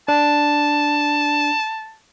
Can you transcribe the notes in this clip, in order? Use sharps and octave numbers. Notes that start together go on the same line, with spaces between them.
D4 A5